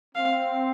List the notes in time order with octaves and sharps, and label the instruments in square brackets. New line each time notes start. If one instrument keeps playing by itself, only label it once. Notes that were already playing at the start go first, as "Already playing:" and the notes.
[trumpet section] C4 [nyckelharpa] F5